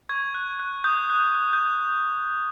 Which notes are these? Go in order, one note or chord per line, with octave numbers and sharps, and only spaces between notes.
C#6 G#6
F#6
F#6
D#6 G6
F#6
F#6
G6